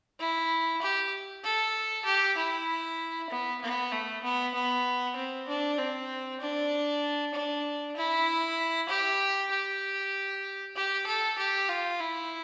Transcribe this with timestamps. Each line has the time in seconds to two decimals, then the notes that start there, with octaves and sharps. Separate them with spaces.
0.20 E4
0.82 G4
1.44 A4
2.06 G4
2.38 E4
3.30 B3
3.62 B3
3.92 A3
4.24 B3
4.55 B3
5.16 C4
5.48 D4
5.78 C4
6.41 D4
7.34 D4
7.96 E4
8.89 G4
9.51 G4
10.76 G4
11.07 A4
11.38 G4
11.69 F4
12.00 E4